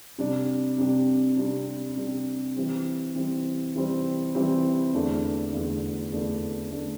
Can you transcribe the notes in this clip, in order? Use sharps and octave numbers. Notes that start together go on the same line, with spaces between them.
C3 G3 D4 G4
C3 G3 D4 G4
C3 G3 D4 G4
C3 G3 D4 G4
E3 G3 C4
E3 G3 C4
E3 G3 C4
E3 G3 C4
E2 D3 A3 D4
E2 D3 A3 D4
E2 D3 A3 D4
D3 A3 D4